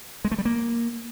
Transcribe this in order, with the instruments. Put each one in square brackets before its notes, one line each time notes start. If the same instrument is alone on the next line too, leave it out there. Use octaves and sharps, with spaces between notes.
[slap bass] G#3
A3
G3
A#3